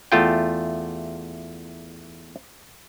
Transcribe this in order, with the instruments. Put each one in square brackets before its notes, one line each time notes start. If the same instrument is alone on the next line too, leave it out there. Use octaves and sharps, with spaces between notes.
[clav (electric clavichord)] E2 A3 F4 G5